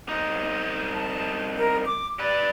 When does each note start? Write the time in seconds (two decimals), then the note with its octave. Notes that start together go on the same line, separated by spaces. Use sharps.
0.09 C2 D#4
0.94 A5
1.57 A#4
1.86 D6
2.19 G4 B4 D5